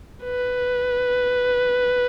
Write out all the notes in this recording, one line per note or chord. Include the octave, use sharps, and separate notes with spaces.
B4